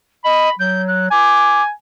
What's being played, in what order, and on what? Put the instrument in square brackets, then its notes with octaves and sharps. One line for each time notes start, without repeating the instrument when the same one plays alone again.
[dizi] D#5 [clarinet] B5
[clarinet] F#3 [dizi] G6
[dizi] F#6
[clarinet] G#5 [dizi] D6